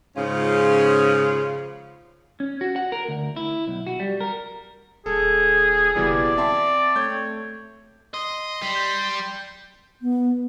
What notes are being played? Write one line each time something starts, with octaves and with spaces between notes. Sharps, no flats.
G#2 C#3 F3 C#4 F4
C#4
F#4
F#5
A#4
D2
E4
B1
F#4
G3
A#4
D#1 G#4 A4
F#1 B2 E3 G3 D5
C4 E5 A5 C6
A3 C#5 G6
D#5 C6
G3
G6
B3